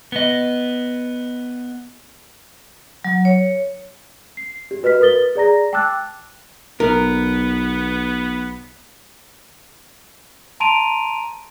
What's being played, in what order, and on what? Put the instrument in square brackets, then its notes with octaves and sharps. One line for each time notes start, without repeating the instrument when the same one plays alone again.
[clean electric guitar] B3 D#5
[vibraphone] F#3
C#5
[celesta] C7
G4
F#4 B4 D#5 F6 B6
A#4 B4 D#6 A6 G7
G#4 D5 A#5 A#6
G5 A5 D6 E6 F#6 A6
[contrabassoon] B1 [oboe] B3 [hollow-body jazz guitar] A#4
[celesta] A5 A#5 C6 D7 D#7 F7